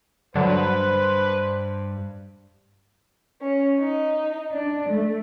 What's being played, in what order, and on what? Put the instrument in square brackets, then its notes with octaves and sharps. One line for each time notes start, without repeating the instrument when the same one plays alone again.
[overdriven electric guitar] G2 [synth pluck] D3 F#3 [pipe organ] B4 [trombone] C5
[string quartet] C#4
D#4
D4
A3